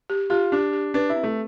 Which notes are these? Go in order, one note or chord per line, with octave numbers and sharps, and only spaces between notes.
G4
F4 G4
D4 G4
G4
D4 B4
E4
C4
A3